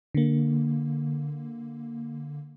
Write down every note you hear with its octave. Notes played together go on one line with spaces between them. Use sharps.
D3 A#3